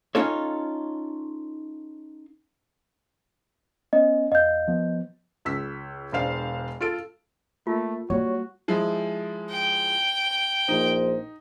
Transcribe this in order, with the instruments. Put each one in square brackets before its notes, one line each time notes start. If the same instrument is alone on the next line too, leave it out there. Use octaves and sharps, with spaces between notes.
[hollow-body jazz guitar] C#4 D#4 F4 A4 C#5
[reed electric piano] B3 C#4 [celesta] D#5
[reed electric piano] E2 F5 [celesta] D#5 G6
[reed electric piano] F3 B3
[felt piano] C#2 E6 B6
E1 D4 C5 F5 C7
F4 A4 D7
[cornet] A3 [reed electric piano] A#3 [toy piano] F4
[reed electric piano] G3 C#5 [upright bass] A#3 [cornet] F#4
[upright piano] F3 G#3 E4
[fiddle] G5
[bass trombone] A#1 [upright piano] D#4 [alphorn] C5